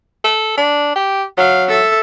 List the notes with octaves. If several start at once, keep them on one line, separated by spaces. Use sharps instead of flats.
A4
D4
G4
F#3 F5
A4 E5